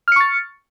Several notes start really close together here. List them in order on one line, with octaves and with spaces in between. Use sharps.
F6 C#7 C#6 A6